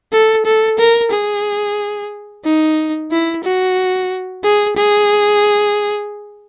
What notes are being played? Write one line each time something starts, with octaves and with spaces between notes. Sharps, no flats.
A4
A4
A#4
G#4
D#4
E4
F#4
G#4
G#4